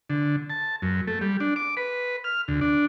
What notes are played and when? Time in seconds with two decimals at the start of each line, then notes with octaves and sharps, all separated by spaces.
0.10 D3
0.50 A5
0.82 F#2
1.07 A3
1.21 G3
1.40 D4
1.56 D6
1.77 B4
2.24 F6
2.48 D2
2.61 D4